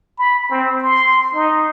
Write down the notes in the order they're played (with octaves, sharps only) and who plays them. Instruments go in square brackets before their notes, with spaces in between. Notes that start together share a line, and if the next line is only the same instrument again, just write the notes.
[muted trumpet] B5
C4
C6
D#4